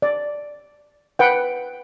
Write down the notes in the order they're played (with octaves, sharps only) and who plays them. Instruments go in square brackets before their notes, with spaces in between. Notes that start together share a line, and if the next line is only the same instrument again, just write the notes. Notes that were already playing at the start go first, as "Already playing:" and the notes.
[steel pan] D5
B4 F#5 G5